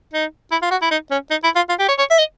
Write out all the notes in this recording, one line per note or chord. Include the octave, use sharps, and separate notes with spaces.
D#4
E4
F4
F#4
E4
D#4
C#4
D#4
E4
F4
F4
G4
C#5
C#5
E5
D#5